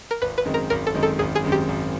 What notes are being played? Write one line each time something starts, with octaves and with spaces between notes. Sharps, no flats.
A#4
G#1 B4
B4
F#2 D#3 G#3 C4
A#4
G#1 A#4
A4
F#2 D#3 G#3 C4
A4
G#1 G#4
G#4
F#2 D#3 G#3 C4
G4
G#1